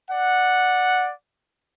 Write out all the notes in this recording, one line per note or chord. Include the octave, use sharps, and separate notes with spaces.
D5 F#5